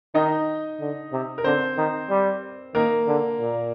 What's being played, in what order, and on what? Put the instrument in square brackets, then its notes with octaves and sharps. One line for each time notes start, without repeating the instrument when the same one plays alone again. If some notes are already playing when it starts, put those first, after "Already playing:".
[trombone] D#3 [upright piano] D#4 D#5
[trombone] D3
C3
[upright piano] A#4
[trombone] D3 [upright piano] C4 C5
[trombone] D#3
G3
[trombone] D#3 [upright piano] A#3 A#4
[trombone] D3
A#2